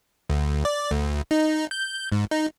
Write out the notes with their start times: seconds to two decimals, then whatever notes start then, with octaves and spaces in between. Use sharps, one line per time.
0.30 D2
0.65 D5
0.91 D2
1.31 D#4
1.71 G6
2.12 G#2
2.31 D#4